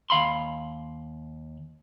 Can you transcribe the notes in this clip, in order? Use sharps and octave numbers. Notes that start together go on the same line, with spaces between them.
D#2 F5 B5 C6